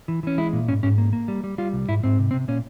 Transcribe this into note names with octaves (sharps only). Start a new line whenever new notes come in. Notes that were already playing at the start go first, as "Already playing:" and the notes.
E3
E3 C#4
G#3 E4
A#2
G#2 C#4
G#2 C#4
A#3
A#3
G3
G3
G3 F4
C2
G#2 E4
G#2 C4
C3
C4
C3
A#2 C#4